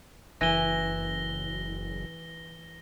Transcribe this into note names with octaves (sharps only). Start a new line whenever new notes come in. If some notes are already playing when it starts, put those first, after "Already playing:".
F#1 E3 A#6 G7